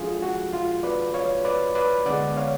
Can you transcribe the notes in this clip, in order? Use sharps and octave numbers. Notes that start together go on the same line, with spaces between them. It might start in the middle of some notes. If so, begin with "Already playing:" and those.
Already playing: F3 G#3 D4 F4 F#4 G#4 A4
F#4
F4
B4 D5
C#5 F5
B4 D5
B4 D5
D3 G#3 B3 D5 F#5
C#5 F5